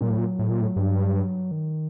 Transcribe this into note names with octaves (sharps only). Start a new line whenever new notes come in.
A#2 F#3
A2
A#2
A2
A#2
A2
G2
D#3